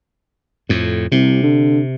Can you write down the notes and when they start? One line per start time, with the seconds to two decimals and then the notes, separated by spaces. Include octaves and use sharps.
0.69 F2 A2
1.12 C2 C3
1.43 D3